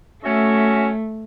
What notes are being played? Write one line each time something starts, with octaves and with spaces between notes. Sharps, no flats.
A3 C#4 F#4 E5